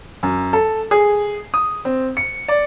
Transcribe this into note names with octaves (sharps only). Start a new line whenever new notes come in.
F#2
A4
G#4
D#6
C4
C#7
D5